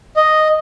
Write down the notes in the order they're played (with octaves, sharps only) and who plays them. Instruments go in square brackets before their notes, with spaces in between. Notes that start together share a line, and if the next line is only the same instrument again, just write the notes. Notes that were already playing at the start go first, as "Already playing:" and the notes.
[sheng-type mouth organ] D#5